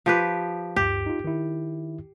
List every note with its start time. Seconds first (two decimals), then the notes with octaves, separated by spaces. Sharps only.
0.06 F3 G4 B4
0.76 D2 G2 G4
1.06 D#4 F4
1.24 D#3 E4